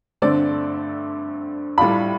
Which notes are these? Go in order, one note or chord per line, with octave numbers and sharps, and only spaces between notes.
G2 D3 A3 C4 D5
A2 G3 D4 F4 B5